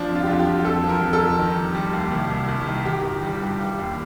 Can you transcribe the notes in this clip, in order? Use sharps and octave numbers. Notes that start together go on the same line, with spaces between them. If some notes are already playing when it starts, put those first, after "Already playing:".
Already playing: F3 D4
F2
F4
G4
F2 F4
G4
F3
G4
F2 A4
F3
A#4
F2
A4
F2
D#3
G3
G3
D#2
C2
C2
C2
D#3
D#3 G4
G1
G3
G2
G3
D#2